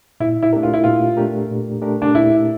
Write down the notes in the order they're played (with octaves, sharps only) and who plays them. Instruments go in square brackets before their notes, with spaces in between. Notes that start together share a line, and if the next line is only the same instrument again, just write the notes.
[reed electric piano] A#2 [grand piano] E4
[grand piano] E4
[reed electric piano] A3 D4 G4 A#4
[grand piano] F4
E4
[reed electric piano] A#2 [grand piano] F4
[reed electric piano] A3 D4 G4 A#4
A#2
A3 D4 G4 A#4
[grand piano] D4
[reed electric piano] A#2 [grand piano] E4